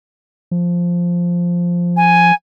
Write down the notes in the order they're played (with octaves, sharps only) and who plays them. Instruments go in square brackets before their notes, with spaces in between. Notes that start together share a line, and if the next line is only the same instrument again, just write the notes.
[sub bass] F3
[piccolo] G#5